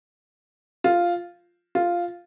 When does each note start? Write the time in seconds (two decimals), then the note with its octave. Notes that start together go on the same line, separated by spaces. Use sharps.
0.84 F4
1.75 F4